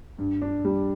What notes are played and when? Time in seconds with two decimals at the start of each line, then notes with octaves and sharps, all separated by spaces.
0.18 G2
0.42 D4
0.65 G3